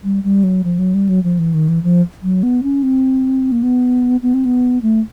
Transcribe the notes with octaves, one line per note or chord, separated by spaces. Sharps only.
G3
G3
F#3
F3
F#3
G3
F#3
F3
E3
D#3
E3
F3
F#3
B3
C#4
C4
A#3
B3
B3
C4
B3
A3